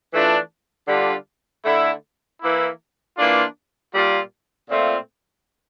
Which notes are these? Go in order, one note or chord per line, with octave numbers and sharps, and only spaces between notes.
E3 A3 D4 F4
D3 G3 D4 F4
D3 A3 E4
E3 A#3 E4
E3 A#3 D4 F4
A#2 G3 A#3 F4
A#2 A3 C4 F4